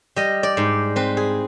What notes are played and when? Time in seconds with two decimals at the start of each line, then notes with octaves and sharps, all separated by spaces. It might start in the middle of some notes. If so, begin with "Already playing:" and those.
0.16 G3 D#5
0.43 D5
0.57 G#2
0.96 C4 B4
1.17 G#4